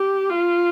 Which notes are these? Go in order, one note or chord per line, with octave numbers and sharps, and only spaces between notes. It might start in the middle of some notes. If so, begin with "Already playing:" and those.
Already playing: G4
F4